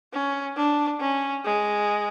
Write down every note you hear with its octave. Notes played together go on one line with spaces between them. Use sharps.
C#4
D4
C#4
G#3